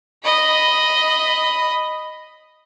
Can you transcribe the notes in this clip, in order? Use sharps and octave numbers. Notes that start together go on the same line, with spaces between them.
D#5 B5